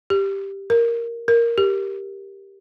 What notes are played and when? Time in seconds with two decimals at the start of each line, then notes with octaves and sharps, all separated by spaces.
0.10 G4
0.70 A#4
1.28 A#4
1.58 G4